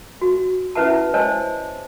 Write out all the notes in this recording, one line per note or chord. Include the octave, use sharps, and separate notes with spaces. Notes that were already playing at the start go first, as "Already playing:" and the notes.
F#4
C#4 E4 B4 E5 F#5 A5
C5 C#5 D#5 G#5 A5